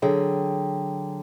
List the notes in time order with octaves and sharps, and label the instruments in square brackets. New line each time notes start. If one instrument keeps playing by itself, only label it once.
[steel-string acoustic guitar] D3 F#3 G#4 G5